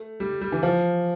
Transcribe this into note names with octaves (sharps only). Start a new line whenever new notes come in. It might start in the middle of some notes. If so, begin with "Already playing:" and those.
Already playing: A3
G3
G3
E3
F3